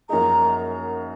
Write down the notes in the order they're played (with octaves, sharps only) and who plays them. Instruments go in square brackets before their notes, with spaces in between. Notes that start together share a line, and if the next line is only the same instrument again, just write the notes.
[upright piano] F#2 F3 A#3 D#4 G#4 [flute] A#5